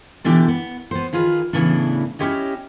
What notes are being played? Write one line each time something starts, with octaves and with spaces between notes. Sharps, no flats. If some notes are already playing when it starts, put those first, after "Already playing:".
B2 D3 E3 D4 G4
B3
B3 C5
D#3 F4 G#4 B4
A2 C#3 E3 B3 D4
C#4 E4 F4 G4 C#5 D#5